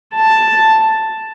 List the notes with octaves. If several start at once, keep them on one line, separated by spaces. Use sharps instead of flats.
A5